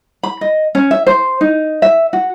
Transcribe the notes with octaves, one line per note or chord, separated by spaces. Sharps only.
B5
D#5
C#4
E5
C5
D#4
E5
F#4